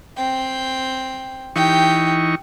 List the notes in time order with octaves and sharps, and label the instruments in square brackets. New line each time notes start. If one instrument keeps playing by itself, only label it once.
[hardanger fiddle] C4 G5
[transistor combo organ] E3 D#4 C#6 [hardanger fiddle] G4 G5